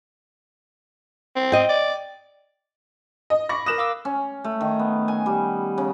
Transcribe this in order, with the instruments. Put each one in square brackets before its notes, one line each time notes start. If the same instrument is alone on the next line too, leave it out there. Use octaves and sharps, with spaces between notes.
[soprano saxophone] C4
[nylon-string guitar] D#5 G5
[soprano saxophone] D5
[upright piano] D#5
[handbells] B5 [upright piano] C#6 D6 A#6
[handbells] A#4 A#6 [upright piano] D#6 F#6 E7
[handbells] F5 D6 E6
[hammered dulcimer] C#4
A3
D#3
B3
G#5
G3
C#3